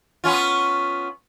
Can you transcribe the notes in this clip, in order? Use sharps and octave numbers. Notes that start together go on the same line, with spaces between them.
B3 C#4 F4